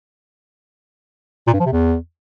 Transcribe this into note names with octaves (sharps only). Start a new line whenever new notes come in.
A#2
G2
F3
C3
E2